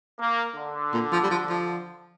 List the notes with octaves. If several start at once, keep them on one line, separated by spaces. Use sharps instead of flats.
A#3
D3
A#2
F3
G3
F3
F3